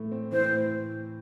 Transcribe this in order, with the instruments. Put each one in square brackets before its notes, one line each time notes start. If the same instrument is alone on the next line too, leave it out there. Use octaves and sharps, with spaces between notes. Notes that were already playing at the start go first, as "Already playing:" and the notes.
Already playing: [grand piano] A2 E3 A3
C4
[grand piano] E3 [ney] C5
[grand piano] A2